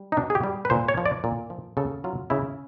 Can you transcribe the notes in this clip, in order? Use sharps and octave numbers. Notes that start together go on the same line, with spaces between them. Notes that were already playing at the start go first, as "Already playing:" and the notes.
Already playing: G3
D#4
B2 D4
G#4
G4
G3
B4
A#2 C5
C#5
F3
D5
A#2
F3
C#3 A4
F#3 F4
C#3 E4